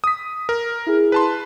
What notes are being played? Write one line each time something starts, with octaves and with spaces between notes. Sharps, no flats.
D#6 B6
A#4
E4 G#4
B4 A5 C6